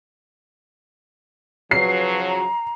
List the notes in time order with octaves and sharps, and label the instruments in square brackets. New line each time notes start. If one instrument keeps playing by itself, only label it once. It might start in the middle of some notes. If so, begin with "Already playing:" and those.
[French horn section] C#3 F3 F#3 [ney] B4 [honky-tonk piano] C7
[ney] A#5